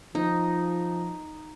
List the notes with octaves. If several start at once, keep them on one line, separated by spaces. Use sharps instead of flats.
F3 D#4